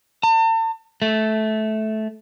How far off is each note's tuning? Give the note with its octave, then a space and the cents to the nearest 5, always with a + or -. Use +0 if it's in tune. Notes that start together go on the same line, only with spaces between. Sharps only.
A5 +40
A3 -15